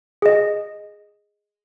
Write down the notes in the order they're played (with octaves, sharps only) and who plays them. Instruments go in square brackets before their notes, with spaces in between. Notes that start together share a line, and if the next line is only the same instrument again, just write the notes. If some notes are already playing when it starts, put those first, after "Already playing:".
[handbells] G#4 D#5